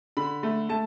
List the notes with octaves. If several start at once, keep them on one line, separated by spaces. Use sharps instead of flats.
D3 B5
A3
A3 A5